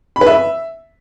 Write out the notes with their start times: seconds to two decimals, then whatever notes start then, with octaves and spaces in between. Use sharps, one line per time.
0.16 B5
0.21 B4
0.27 E5